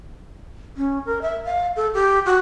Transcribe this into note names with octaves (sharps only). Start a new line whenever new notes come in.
C#4
A#4
E5
F5
A4
G4
F#4